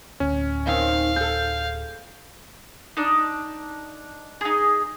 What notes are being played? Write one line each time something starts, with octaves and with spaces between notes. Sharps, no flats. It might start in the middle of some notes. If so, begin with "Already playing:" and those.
D1 C#4
D#3 C4 D#4 F5
G#4 A4 G6
D4 D#4
D#4 G#4